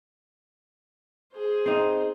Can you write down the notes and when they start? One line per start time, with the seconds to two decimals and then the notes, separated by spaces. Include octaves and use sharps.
1.33 G#4 C5
1.66 C4 D#4